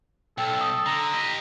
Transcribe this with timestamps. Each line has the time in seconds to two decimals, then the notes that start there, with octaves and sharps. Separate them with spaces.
0.38 B1 A4 G5
0.61 D#6
0.86 D3 A#5
1.13 G4 D#5